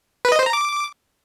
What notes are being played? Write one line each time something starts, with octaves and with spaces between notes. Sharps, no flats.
B4
D#5
C5
A#5
D6